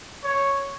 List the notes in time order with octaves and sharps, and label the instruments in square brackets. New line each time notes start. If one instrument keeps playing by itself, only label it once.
[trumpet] C#5